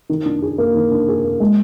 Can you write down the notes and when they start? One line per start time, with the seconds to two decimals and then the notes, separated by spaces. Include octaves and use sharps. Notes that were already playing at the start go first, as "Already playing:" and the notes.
0.09 D#3
0.26 D4
0.42 G#4
0.58 A#3
0.74 D#3
0.92 D4
1.08 G#4
1.24 A#3
1.40 G#3